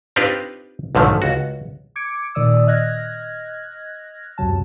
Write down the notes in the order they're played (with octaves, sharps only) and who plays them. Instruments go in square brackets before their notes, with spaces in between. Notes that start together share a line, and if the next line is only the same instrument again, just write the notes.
[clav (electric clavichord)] C4 D4 D#4 F4 G4 B4
B1 G#2 D3 D#3 F3 A3
C#2 F#4
[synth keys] D6 G#6 C#7 D7
A#2 D#3 D5 D#6 E6
D#5 F6 F#6 G#6 A#6
C#2 F#2 C3 F#3 A5